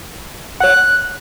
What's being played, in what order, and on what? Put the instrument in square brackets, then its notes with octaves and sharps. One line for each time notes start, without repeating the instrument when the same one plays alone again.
[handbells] C#5 F#5 [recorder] F#6